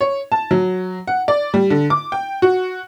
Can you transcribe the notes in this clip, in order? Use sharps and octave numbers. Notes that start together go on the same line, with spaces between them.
C#5
A5
F#3
F#5
D5
G3
D3
D6
G5
F#4